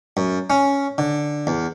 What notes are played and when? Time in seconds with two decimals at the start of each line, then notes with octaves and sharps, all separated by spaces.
0.17 F#2
0.50 C#4
0.98 D3
1.47 E2